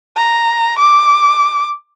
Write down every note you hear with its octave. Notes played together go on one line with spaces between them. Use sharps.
A#5
D6